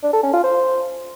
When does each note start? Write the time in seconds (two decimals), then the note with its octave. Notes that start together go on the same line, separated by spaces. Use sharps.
0.03 D4
0.13 A4
0.23 C#4
0.33 F4
0.44 C5